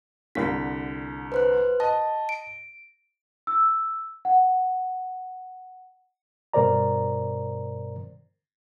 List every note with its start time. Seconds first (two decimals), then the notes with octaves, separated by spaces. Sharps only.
0.35 C2 D3 B6
1.32 B4 C5 F#6
1.80 D#5 A5
2.29 D7
3.47 E6
4.25 F#5
6.53 G2 B2 A#4 C5 D5 A#5